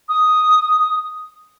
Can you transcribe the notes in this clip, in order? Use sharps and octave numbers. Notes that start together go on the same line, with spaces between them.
D#6